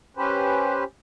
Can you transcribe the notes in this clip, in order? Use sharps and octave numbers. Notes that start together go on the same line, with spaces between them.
C#4 G4 B4 C5